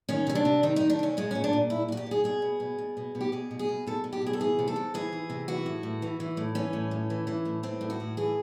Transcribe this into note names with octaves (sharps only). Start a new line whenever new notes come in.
D#3 C#4
C3 C#4
D4
C3
D#3 D#4
D#3 D#4
D4
C3 C#4
A#2 G#3
A#2 C#4
D4
A#2
A#2 E4
A#2 F#4
G4
A#2 G#4
B2 G#4
B2
B2
B2
B2
B2
G4
B2 G#4
B2
G#4
B2
B2 A4
B2
G4
B2 G#4
A4
E3 G#4
C3
A4
C3
E3 G#4
E3
C3
E3 F#4
A2
A2
E3
E3
A2
E3 C#4
A2
A2
E3
E3
A2
E3 C4
A2
F#4
A2
E3 G#4